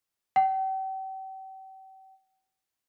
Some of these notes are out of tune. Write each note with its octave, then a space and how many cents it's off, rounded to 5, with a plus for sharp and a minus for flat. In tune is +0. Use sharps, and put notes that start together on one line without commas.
G5 -40